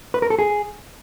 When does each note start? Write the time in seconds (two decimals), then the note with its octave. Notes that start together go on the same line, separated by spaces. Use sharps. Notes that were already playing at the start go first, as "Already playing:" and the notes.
0.14 B4
0.22 A#4
0.30 A4
0.39 G#4